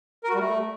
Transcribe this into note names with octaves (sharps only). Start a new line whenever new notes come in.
A#4
F#4
G3
A3